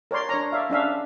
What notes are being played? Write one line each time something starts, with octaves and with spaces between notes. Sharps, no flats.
A#4 C#5 D5 C6
D4 C#5 A#5
D5 E5 F5
C#4 D4 E5 F5